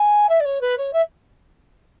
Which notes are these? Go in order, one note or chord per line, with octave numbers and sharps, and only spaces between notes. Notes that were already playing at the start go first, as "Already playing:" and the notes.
Already playing: G#5
E5
D5
C#5
B4
C#5
E5